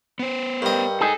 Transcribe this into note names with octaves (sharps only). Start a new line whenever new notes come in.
B3 C5
G2 A#4 D#5 G5
D#4 G#4 A4